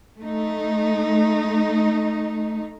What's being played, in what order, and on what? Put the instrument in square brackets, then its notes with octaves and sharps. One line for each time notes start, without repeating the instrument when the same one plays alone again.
[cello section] A3 D#4